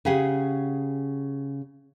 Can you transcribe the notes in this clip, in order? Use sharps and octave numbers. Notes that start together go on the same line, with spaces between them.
C#3 G4 G#4 F#5